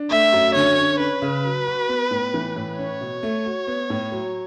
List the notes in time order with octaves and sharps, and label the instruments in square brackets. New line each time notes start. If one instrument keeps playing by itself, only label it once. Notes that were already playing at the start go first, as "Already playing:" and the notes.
Already playing: [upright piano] D4
[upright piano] A3 [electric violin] E5
[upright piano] F#2
[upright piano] D3 [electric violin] C#5
[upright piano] C#4
[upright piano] C#4 [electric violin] B4
[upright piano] C#3
F#3
F#4
B3
A2
E3
A2
[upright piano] C#4 [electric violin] C#5
[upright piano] B2
A3
F#4
B3
A2
F#3